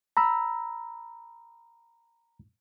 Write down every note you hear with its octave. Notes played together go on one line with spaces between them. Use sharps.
A#5 B5 E6